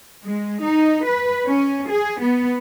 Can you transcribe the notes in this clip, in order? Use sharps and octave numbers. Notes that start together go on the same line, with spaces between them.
G#3
D#4
B4
C#4
G#4
B3